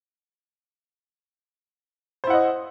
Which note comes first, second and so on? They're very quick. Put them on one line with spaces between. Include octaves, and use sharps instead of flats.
C5 E4 F#5 D#5